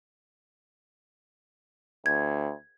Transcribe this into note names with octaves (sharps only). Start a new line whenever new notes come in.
D2 G#6